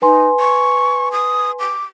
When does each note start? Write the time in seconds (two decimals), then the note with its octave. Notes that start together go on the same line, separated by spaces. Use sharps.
0.02 D#4 B4 G#5 C6
0.40 C#6
1.12 D#6
1.60 D6